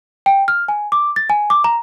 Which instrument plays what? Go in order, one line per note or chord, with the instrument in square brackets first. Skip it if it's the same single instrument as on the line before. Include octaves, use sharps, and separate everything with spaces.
[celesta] G5
F6
G#5
D6
A6
G#5
D6
A#5